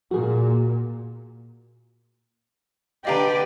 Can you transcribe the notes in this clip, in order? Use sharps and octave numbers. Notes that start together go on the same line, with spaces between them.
A#2 F#4 G#4
D3 G4 B4 D5 D#5 F5 A#5